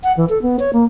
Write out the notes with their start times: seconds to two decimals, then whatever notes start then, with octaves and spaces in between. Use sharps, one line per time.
0.03 F#5
0.17 E3
0.29 A4
0.42 B3
0.60 C#5
0.73 A#3